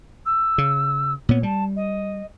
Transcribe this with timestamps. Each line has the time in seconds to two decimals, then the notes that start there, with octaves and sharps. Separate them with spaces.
0.25 E6
0.58 C#3
1.29 A#2 B3 C#5
1.43 G3 A5
1.75 D#5